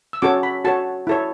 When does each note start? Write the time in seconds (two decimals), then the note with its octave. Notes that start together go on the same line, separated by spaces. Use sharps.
0.13 E6
0.22 C#4 F#4 A4 C#5 D6
0.43 B5
0.65 F#4 A4 C#5 A5
1.07 E4 A4 C#5